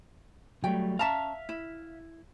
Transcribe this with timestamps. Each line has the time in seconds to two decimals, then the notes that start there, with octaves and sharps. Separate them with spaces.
0.64 F#3 G3 A3 G5
0.99 C#4 E5 F5 A5 A#5
1.49 E4